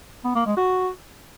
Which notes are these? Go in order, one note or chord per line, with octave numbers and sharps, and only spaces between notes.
B3
A#3
G#3
F#4